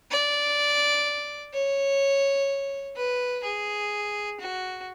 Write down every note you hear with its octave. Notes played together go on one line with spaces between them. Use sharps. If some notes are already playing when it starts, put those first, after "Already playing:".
D5
C#5
B4
G#4
F#4